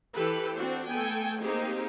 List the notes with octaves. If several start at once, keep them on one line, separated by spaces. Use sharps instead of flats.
E3 G4 A4 B4
C4 D4 F#4 C5
A3 B3 A4 G5 G#5
A#3 C4 D#4 G4 G#4